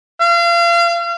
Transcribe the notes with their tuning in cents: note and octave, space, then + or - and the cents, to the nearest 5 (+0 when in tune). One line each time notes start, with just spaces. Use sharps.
F5 -35